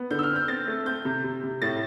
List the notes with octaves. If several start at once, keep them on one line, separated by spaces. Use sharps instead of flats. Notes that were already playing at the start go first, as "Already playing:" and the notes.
Already playing: B3
D3 G6
E6
F6
C4
G6
C4 A6
A3
C4 G6
C3
C3
C3
A2 A6